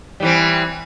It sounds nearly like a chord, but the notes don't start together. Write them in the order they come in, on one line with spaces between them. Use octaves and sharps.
G3 E3 C4